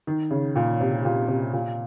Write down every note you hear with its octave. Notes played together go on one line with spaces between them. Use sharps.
D#3
C#3
A#2
C3
A#2
C3
A#2